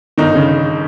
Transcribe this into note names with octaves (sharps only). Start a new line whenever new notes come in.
G1 D#3 D#4
C#3